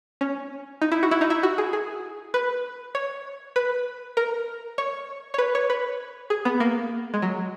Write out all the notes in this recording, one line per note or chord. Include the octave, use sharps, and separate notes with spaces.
C#4
D#4
E4
F#4
E4
D#4
E4
F#4
G#4
G#4
B4
C#5
B4
A#4
C#5
C#5
B4
C#5
B4
G#4
B3
A#3
G#3
F#3